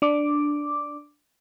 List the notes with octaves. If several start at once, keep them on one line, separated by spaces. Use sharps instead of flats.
D4 D6